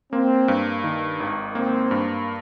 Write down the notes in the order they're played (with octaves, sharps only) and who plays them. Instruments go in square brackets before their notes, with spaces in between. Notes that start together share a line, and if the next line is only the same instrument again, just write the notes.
[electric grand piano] A#3 [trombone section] C4
[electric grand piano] G2
D#3
G#1
[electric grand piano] A#3 [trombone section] C4
[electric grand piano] G2